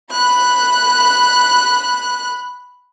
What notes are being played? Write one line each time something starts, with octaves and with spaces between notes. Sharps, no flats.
B5 F#6